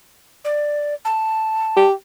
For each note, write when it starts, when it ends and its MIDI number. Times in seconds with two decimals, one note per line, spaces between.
0.45 0.94 74
1.05 1.87 81
1.77 1.92 67